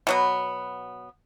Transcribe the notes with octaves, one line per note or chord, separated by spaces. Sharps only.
B2 F#3 B3